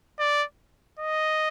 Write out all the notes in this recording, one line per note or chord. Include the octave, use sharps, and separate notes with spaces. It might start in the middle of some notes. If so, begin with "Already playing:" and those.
D5
D#5